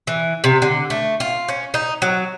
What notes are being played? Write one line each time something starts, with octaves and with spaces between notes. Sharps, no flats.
E3
C3
D3
A3
F4
C#4
D#4
F#3